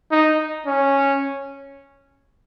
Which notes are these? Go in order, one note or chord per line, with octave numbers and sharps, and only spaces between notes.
D#4
C#4